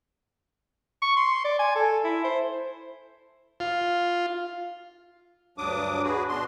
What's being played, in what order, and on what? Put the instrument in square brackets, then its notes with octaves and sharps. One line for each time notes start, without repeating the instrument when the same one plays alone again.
[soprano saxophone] C#6
C6
D5
G#5
A4
E4
C5
[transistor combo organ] F4
[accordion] D2 G2 F#3 D4 D6 D#6
F#4 G#4 B4
B2 D4 C6